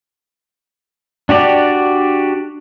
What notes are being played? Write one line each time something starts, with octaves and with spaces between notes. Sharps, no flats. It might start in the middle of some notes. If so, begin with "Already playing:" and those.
D4 F#4 G4 D5